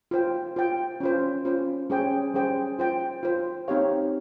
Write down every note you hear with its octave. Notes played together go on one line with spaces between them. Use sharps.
F4 C5 G5
F4 C5 G5
C#4 F4 C5
C#4 F4 C5
G3 C#4 G#4 C5 G5
G3 C#4 G#4 C5 G5
F4 C5 G5
F4 C5 G5
C4 D#4 G4 C#5 F5